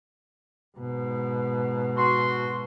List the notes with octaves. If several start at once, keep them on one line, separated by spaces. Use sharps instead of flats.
G#2 B2
F#4 C6